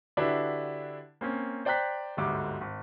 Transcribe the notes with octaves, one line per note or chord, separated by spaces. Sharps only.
D3 D4 E4 F#4 G4 B4
A#3 C4 C#4
C5 D5 G5 A#5 F#6 B6
G1 D2 G#2 G3 D6
G#1